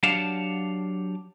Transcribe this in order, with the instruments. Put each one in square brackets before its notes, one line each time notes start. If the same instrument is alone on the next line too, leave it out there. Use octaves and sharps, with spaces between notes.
[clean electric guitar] F#3 D4 G4 F5 F#5 A5